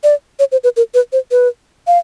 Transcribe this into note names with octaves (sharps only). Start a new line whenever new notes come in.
D5
C#5
C5
B4
A#4
B4
C5
B4
F5